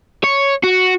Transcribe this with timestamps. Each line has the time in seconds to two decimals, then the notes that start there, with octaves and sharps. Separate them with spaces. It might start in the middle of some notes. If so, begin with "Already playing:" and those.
0.23 C#5
0.63 F#4